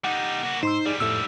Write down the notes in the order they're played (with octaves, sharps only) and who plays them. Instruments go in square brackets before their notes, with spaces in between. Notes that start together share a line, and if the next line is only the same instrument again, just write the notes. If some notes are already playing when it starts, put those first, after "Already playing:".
[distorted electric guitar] G3 D#4 [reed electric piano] F#5 D6
[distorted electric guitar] A#3 F#4
[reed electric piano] G#2 C6 E6 [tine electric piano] D#4 [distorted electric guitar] C5
[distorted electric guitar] G#2 G3 [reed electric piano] G#4 D5
[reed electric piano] F2 A2 A3 [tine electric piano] E6